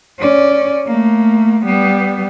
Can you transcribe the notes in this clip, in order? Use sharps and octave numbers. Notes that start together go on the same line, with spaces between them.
C#4 D5
A3 A#3
G3 B3